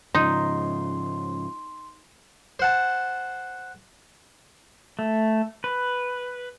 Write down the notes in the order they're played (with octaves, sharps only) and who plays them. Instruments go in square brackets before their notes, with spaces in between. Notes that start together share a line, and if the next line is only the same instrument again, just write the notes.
[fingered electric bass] G#2 C#3 F3 [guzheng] D#4 [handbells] C6
[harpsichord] C5 F#5 A5
[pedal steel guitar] A3
B4